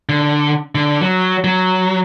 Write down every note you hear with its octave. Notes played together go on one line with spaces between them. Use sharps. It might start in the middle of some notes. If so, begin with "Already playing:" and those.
D3
D3
F#3
F#3